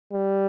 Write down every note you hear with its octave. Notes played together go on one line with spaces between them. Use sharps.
G3